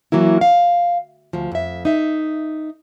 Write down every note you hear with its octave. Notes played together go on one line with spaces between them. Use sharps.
E3 F#3 A#3 E4
F5
D2 F3
F2 E5
D#4 E5